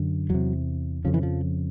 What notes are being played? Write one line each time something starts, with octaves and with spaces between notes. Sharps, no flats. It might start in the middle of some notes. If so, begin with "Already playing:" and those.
Already playing: F#2 D3
E2 C3 F#3
F2 C#3 F3
E3
F3